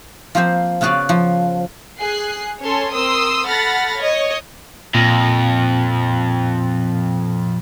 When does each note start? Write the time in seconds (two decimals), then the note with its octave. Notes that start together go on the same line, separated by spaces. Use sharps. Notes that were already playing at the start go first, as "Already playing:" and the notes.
0.35 F3 A#3 C4 C5
0.81 C#3 B3 F#4 B4 D5 F5
1.09 F3
2.00 G#4 F#6 C7
2.62 C#4 A4 C#5 A5 C6
2.93 C4 A#4 C6 D#6 E6
3.47 A4 F#5 B5 F6 A6 A#6
4.00 C#5 D#5
4.95 F2 A#2